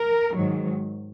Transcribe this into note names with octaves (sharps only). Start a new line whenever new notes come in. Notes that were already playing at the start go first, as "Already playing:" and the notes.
Already playing: A#4
G#2 D#3 F#3